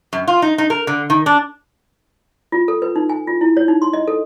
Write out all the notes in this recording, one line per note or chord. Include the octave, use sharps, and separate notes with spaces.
F#2
F4
D#4
D#4
A#4
D3
D#3
D4
F4
A4
B4
D#4
G#5
F4
E4
C#5
D#4
C6
D#5
A4